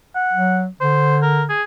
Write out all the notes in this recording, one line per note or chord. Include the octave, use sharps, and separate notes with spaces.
F#5
F#3
D3 C5
A#4
G#4